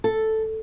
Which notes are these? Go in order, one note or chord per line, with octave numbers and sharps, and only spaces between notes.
A4